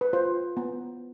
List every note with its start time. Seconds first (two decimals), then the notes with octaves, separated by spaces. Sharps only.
0.01 B4
0.13 F4 C5
0.57 B3